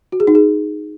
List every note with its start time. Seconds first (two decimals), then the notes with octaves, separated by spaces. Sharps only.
0.12 F#4
0.20 G#4
0.27 D#4
0.35 G#4